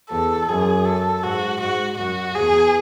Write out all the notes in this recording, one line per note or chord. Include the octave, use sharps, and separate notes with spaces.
E2 A4
F#2 G#4
A4
G#2 F#4
G#2 F#4
F#2 F#4
E2 G#4